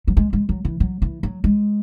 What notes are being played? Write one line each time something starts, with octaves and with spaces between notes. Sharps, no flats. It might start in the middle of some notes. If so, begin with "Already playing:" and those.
F#3
G#3
G#3
F#3
E3
F#3
E3
F#3
G#3